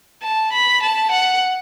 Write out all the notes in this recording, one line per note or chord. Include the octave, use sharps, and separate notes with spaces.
A5
B5
A5
F#5